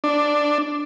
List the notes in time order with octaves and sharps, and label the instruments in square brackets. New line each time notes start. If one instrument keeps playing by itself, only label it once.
[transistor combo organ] D4